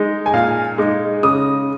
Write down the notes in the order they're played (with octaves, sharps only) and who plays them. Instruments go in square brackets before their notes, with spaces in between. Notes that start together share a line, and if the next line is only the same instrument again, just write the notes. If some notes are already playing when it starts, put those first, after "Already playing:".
Already playing: [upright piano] G#3 D#4
G#5
A#2 F5
G#3 D#4
C#3 D#6